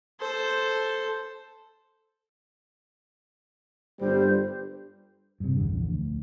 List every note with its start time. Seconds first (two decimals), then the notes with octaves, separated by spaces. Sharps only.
0.20 A4 C5
4.00 G1 G2 G3 C5
5.40 G2 C3
5.55 A#1 E2 D3
5.87 D2